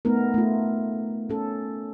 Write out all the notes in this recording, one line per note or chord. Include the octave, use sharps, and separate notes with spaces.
A3 B3 D#4 A#4
A3 F4
C#4 A4